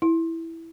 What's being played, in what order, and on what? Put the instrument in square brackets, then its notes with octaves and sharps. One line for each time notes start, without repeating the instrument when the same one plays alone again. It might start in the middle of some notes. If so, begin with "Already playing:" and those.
[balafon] E4